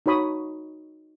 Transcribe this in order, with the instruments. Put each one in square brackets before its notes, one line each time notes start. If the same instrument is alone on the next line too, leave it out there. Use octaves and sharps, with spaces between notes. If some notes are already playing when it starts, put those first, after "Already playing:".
[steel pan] D#4 F#4 C#5 B5 D#6